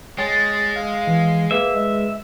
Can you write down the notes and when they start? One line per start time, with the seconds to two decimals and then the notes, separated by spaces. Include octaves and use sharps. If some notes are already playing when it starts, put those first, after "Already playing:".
0.18 G#3 C#5 G5 G#5 A6
0.76 F5
1.07 E3
1.51 A#3 G#4 B4 E5
1.74 G#3